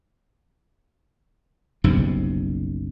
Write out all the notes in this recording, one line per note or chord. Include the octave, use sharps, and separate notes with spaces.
F#1 B1 G2 C3